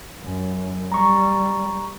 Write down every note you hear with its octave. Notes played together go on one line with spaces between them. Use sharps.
F#2
G3 A#5 C#6